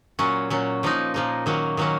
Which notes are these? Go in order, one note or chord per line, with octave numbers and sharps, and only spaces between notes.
A#2 F#3 C#4
A#2 F#3 C#4
A#2 F3 A#3 D#4
A#2 F3 A#3 D#4
D#3 F#3 A#3 C#4
D#3 F#3 A#3 C#4